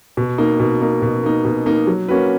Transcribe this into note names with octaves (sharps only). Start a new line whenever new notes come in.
B2
A#3 D#4
B2
A#3 D#4
B2
A#3 D#4
B2
A#3 D#4
F#3
A#3 C#4 F#4 B4